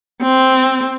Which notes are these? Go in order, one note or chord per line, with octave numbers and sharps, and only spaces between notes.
C4